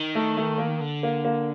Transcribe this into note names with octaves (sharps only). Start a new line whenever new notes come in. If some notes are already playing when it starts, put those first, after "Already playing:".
Already playing: D#3
A3
A3
A#3
D3
A#3
A#3